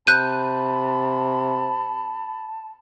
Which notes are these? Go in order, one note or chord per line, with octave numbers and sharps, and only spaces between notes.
C3 A5 B5 F#6 G6 D#7